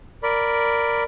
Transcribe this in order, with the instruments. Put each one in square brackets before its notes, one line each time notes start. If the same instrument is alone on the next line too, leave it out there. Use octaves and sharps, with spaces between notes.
[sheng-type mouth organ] A#4 D5 B5